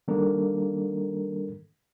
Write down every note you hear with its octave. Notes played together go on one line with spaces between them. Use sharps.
D#3 G3 A#3 D4 A4 A#4